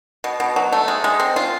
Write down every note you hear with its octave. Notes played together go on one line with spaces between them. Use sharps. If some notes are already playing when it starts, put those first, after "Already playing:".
B2
B2
F#3
A3
G#3
G#3
C4
F4